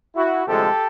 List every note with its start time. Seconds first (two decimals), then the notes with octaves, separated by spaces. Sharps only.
0.16 E4 F#4
0.47 D2 C3 F3 G#3 G4 A4